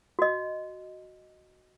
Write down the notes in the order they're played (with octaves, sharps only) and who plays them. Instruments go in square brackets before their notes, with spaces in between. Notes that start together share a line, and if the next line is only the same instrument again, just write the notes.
[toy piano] F#4 D#5